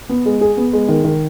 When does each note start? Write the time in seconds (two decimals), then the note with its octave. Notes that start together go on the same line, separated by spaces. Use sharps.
0.09 B3
0.26 G#3
0.41 G#4
0.57 B3
0.73 G#3
0.89 D#3
1.04 D#3